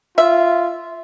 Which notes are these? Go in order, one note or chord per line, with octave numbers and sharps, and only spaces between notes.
F4 E5